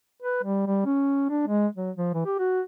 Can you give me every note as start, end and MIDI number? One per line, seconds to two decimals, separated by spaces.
0.22 0.43 71
0.43 0.62 55
0.67 0.83 55
0.86 1.27 61
1.30 1.46 62
1.47 1.67 56
1.76 1.91 54
1.96 2.10 53
2.14 2.23 52
2.25 2.35 67
2.39 2.61 66